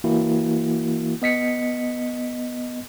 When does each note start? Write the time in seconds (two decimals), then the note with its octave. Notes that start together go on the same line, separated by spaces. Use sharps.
0.04 E3 A#3 E4 F#4
1.22 B3 D#5 B6 C#7